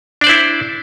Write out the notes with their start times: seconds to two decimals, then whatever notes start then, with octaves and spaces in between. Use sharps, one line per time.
0.21 D4
0.24 D5
0.27 C5
0.29 E4